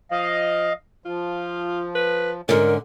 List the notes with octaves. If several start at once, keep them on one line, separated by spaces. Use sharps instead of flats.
F3 D#5 F5
F3 F4
B4
G#2 D3 C#4 A#4